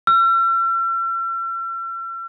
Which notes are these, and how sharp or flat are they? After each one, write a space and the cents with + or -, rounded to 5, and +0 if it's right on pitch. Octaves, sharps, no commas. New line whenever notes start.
E6 +45